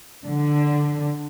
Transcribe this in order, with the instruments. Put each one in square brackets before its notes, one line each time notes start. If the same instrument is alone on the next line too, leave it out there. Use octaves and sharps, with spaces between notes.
[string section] D3